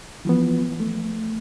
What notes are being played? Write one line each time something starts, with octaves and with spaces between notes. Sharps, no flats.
E3 F3 B3
A3